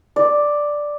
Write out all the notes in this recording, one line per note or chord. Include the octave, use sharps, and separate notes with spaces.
D5